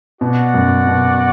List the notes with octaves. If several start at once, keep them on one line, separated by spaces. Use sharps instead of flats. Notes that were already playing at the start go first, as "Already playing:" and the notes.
B2 F#4 D5 F#5
F#2
B2